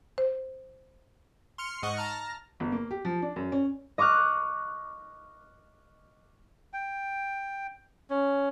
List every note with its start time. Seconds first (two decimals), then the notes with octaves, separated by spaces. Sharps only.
0.18 C5
1.58 C6 F6 C#7
1.82 G#2 D#5 F#5 C#6
1.96 A5 A#5 F6 A#6
2.60 G1
2.72 A#3
2.91 G4
3.05 F3
3.22 D4
3.36 F#2
3.52 C#4
3.98 D#5 C#6 D6 F6 F#6
6.73 G5
8.10 C#4